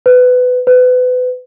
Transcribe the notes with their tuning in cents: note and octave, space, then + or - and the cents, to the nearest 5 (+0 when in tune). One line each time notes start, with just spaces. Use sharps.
B4 +20
B4 +30